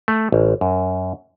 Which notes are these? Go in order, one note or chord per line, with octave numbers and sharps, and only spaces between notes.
A3
A1
F#2